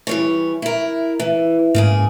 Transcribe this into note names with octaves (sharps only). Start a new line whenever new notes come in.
E3 G3 C#5
E4 A#4
E3
G#2 C#3 A#3 G#4